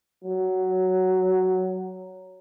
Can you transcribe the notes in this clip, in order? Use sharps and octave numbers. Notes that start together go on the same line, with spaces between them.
F#3